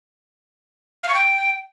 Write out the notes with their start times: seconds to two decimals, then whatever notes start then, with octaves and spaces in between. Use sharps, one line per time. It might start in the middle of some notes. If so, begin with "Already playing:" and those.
1.03 F5
1.08 C#6
1.14 G5